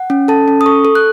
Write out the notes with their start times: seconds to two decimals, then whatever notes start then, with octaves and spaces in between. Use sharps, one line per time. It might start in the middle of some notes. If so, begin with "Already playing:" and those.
Already playing: F#5
0.10 C#4
0.28 A4 A5
0.48 C#4
0.61 D#6
0.66 A4 C#6
0.85 A4
0.95 F#6